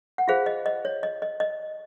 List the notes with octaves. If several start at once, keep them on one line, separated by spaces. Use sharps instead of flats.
F#5
F4 G#4 C5 F5
D#5
D#5
C#5
D#5
D#5
D#5